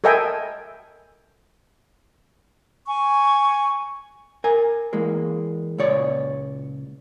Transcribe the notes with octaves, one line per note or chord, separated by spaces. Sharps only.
A4 A#4 D#5 E5 G5 G#5
G#5 C#6
A#4 G#5
E3 G#3 A#3
C#2 A#2 C#5 D5